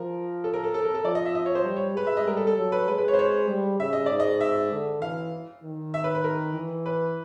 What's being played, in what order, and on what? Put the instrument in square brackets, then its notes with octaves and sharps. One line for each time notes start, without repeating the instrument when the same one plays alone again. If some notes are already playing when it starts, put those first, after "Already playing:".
Already playing: [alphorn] F3 [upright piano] A#4
[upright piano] A4
A#4
A4
A4
A#4
A4
[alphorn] F3 [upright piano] D5
[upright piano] D#5
E5
D#5
C#5
C5
[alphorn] G3
[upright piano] C#5
[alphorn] G#3 [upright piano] B4
[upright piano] E5
D#5
[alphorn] G3 [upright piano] A#4
[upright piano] A4
A4
[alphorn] F#3
[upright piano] B4
[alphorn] G#3 [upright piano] B4
[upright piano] B4
C#5
C5
C#5
[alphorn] G3
[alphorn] C#3 [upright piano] E5
[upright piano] D#5
[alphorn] G#2 [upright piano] D5
[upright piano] D#5
E5
[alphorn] D3
[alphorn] E3 [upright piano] F5
[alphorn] D#3
[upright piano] E5
B4
B4
A#4
[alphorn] E3
[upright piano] B4